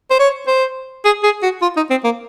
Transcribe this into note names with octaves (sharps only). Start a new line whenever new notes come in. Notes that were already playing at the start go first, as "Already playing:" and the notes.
C5
C#5
C5
G#4
G#4
F#4
F4
D#4
C4
A#3